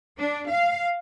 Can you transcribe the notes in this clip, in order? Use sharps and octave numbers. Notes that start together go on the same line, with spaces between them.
D4
F5